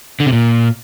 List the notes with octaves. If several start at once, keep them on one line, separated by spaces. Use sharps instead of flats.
D3
C3
A#2